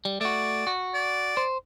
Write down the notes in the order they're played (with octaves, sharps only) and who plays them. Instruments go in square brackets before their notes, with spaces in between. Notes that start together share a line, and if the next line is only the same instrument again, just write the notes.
[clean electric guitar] G3
[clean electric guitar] A3 F#4 [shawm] D5
[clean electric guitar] F#4
[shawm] D5
[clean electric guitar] C5